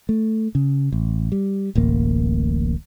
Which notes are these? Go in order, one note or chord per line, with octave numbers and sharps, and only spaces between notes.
A3
C#3
A1
G3
D1 A1 A#3